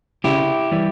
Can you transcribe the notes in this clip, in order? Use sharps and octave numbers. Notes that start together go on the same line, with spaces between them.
C#3 E4 G4
E3 G3